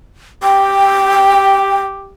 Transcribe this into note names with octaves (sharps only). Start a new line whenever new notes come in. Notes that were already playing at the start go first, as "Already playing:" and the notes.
G4 G5